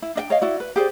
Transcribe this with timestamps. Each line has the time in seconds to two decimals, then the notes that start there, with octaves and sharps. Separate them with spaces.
0.02 E4
0.15 D4 D#5 G5
0.30 C#5 D#5 F5
0.41 E4 F#4 D5
0.60 B4
0.76 G4 G#4 C5 D5